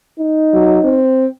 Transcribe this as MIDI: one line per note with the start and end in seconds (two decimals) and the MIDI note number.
0.19 1.01 63
0.54 0.79 54
0.85 1.27 60